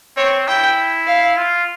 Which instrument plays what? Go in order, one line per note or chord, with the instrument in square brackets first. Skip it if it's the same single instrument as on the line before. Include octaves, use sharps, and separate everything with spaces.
[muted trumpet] C4 [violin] C#5
[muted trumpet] E4 [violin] G5
[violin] F5
[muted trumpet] F4